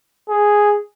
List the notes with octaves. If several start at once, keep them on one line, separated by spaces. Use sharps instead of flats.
G#4